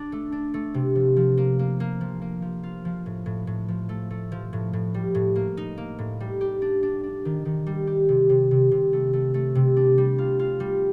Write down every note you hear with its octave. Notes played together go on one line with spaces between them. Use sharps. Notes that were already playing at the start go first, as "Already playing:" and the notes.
Already playing: D4
A3
D4
A3
C3
F3
F3
A#3
A#3
A#3
F3
A#3
F3
F4
F3
A2
A2
A2
F3
A3
A3
F3
A2
A2
G3
A2
A#3
D#4
A#3
A2
G3
G4
D4
D4
D4
D#3
D#3
G3
G4
C3
C3
C3
C3
A3
A3
A3
C3
D4
G3
F4
F4
G3